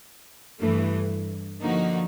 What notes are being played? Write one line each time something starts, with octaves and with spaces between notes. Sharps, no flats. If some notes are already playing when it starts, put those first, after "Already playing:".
G2 E3 A3
D3 F3 A#3 D#4 F#4